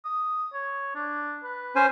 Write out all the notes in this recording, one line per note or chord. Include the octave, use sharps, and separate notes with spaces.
D#6
C#5
D4
B4
C#4 C5 G#5